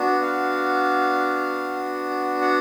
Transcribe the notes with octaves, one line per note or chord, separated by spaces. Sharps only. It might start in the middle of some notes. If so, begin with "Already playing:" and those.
Already playing: B3 D4 F#4
F5
F#5